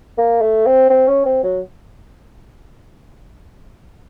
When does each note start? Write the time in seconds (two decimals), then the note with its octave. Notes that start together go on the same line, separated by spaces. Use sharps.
0.18 A#3
0.41 A3
0.66 C4
0.90 C4
1.07 C#4
1.25 C4
1.43 F#3